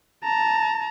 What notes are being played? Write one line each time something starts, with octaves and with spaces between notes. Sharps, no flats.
A5 A#5